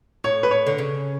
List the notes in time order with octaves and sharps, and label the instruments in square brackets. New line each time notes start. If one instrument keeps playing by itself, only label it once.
[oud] A2 [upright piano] C#5
[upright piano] B4
C#5
[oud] D3
C#3